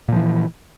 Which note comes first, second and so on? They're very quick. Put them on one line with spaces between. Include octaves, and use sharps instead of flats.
A#2 F3 E3